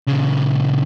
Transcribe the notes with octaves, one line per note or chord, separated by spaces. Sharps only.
A#2 C#3